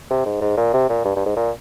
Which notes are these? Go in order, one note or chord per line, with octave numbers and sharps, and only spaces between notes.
C3
G#2
G#2
A#2
C3
A#2
G2
G2
G#2
A#2